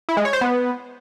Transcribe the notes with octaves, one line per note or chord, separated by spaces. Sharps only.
E4
G#3
C#5
C5
B3